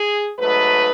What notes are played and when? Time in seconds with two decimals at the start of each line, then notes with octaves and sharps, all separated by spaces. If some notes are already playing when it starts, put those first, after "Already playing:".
Already playing: G#4
0.38 G#2 F#3 A3 D#4 B4